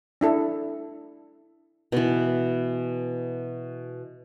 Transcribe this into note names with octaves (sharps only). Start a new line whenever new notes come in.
D4 E4 A4
B2 E3